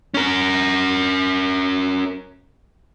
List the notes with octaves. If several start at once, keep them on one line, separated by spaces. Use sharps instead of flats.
C#4 A#4